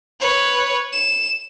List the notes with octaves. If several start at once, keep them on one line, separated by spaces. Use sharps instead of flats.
B4 C#5
E7